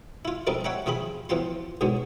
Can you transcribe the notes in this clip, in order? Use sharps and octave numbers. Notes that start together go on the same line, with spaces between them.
E4 F4
F3 G3 C4 D#4 A4 A#4
C#5 E5 F#5 G5 A#5
C3 F3 C4 G#4 B5
E2 F3 F4 G5 A5 C6
G#2 B2 D3 F#3 G#3